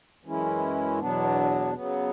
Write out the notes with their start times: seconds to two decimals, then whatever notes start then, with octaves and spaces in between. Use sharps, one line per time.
0.24 F#2 E3 G#3 C#4 E4
0.99 E2 B2 F#3 B3 D4
1.74 C#3 F#3 B3